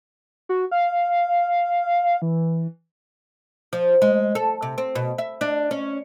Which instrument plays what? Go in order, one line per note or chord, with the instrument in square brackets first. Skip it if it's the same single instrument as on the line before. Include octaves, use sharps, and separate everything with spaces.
[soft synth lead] F#4
F5
E3
[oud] F3
G#3
A4
C3
C4
B2
E5
D4
C#4